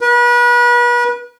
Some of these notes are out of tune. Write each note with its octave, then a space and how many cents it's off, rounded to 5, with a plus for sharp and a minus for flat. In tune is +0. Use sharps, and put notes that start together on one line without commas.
B4 -35